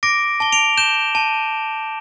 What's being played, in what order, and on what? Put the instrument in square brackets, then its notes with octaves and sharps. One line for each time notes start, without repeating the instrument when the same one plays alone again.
[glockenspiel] D6 A#6 D7
A5 G7
D7 F7
G6 E7 G7
A5